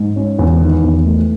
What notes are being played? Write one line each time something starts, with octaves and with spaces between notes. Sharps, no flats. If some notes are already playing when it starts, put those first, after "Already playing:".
Already playing: G#2
C#4
E2
D#3
E2
A3